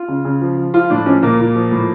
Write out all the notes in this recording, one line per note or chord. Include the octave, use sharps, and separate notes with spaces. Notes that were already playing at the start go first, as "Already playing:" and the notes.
Already playing: F4
C#3
C#3
F3
F3
F3 F4
A2 D4
F3 C#4
A#2 A#3
A#2
F3
A2